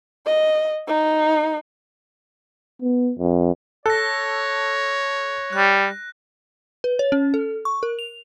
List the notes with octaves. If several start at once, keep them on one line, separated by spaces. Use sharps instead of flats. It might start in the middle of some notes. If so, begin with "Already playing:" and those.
D#5
D#4
B3
F2
A4 C#5 F#6 A#6
G3 F#6
B4
C#5
C#4
A4
C#6
A#4
F7